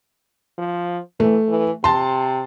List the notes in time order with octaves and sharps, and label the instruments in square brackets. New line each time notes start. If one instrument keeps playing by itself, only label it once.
[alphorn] F3
[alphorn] E3 [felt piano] A3
[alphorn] E3
[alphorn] C3 [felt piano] A5 C6